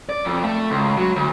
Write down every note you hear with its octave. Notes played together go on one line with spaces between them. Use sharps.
D5
F2
A3
C#2
F#3
D2